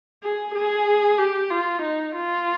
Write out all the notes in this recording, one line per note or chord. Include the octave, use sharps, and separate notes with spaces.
G#4
G#4
G4
F4
D#4
F4